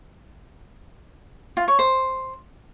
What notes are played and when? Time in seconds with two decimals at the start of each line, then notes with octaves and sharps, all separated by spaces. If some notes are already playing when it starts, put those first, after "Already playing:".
1.57 F4
1.68 C#5
1.79 C5